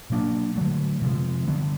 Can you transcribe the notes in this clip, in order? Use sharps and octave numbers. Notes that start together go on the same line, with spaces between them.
B2 F#3 A#3 D4
D3 F#3 A3
C3 F3 G#3
D3 G3 B3